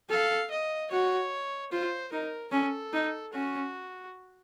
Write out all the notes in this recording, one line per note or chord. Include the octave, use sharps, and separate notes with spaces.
A4 F5
D#5
F#4 C#5
F4 C5
D#4 A#4
C#4 A4
D#4
C#4 F#4